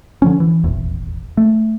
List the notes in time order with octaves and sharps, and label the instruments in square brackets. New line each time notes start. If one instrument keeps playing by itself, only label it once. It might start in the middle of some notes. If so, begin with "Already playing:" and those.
[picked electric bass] D3 F3 C#4
E3
D#1 G#1 E2
A3